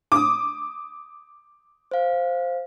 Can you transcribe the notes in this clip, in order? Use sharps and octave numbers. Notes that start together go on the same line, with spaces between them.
D6 D#6
C5 F5